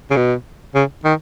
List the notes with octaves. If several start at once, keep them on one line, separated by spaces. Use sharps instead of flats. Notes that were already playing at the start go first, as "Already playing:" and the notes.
C#3
B2
C#3
D#3